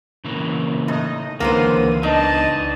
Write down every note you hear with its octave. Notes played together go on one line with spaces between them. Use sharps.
C#3 E3 A#3
A2 D#4 D#5
C#2 D3 E3 A#3 B3 C5 D#7
B3 D4 D#4 D#5 A5